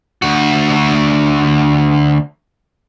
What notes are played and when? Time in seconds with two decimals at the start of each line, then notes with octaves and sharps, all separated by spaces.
0.22 D2 F#4